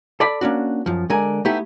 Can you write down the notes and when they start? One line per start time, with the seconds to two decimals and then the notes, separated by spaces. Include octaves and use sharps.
0.20 A4 D5 B5
0.41 A#3 C#4 D4 F#4
0.86 F#2 F3
1.10 D3 G#3 A#4 D5 G#5
1.45 A3 B3 D#4 E4 G4